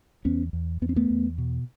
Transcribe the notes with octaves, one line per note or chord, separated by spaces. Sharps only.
E2 B3 C#4
E2
E2 B3
C4
A3 B3
E2
B2